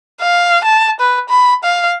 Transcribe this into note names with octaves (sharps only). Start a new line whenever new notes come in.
F5
A5
B4
B5
F5